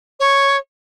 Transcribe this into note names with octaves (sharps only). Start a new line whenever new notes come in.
C#5